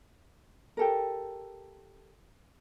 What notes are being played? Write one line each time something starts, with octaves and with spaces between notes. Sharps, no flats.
G4 A4 A#4